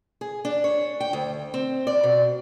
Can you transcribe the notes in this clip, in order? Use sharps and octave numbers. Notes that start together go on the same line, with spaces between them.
G#4
D4
C#5
G5
D2
C4
D5
B2